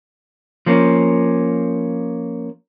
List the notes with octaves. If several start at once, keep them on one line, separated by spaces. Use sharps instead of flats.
F3 A#3 C#4